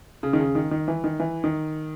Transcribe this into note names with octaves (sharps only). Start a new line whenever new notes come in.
C#3
D#3
C#3
D#3
D#3
E3
D#3
E3
D#3